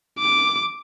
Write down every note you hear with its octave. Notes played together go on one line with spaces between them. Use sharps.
D6